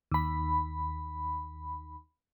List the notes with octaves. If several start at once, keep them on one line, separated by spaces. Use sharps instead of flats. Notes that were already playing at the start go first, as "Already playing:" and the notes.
D#2 B5